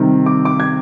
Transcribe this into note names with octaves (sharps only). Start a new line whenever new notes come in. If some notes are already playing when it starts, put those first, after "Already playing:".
Already playing: C3 D#3 G3
D6
D6
G#6